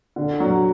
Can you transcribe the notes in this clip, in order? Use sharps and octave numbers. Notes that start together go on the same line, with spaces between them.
D3
F#3